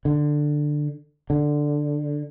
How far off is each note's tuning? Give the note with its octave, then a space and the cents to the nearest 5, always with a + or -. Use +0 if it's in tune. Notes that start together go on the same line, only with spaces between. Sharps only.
D3 +10
D3 +5